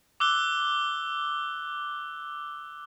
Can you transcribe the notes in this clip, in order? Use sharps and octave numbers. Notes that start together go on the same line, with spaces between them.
D6 E6 F#6 G7